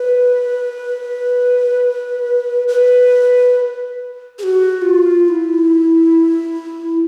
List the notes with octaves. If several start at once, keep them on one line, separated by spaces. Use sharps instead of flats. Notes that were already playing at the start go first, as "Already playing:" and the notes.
Already playing: B4
B4
G#4
F#4
F4
F4
E4